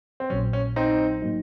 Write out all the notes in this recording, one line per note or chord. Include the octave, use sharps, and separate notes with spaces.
C4
A#1 A#2 F#3 C#4
C#4
C4 D#4
A2 F#3 A#3 D#4